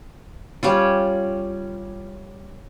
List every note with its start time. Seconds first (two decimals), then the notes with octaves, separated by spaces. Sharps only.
0.63 G3 C#4 F4